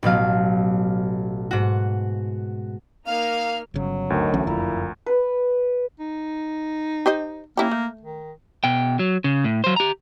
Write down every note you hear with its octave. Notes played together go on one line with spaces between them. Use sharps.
A1 B2 F#3 F5
G#2 F#4
A#3 D#4 F5 F6
G1 C#3 F#3
D2 D#3
B1 F#2 A2 E3 C#4
F#1 F2 A#2 E4 A#5
B4
D#4
G4 C5 D#5
A#3 C#4 E4 G4
A3
D#3
B2 G5
F#3
C#3
A2
F#3 C5
G4 A#5